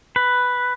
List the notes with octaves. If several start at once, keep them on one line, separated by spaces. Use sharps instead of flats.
B4